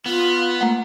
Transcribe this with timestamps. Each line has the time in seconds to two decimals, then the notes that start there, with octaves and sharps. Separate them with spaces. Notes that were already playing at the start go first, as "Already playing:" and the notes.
0.06 B3 F4
0.61 A3 A#3 F#5